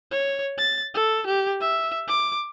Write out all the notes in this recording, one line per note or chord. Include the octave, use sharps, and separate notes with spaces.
C#5
A6
A4
G4
E5
D6